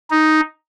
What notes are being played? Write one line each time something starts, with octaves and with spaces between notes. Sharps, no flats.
D#4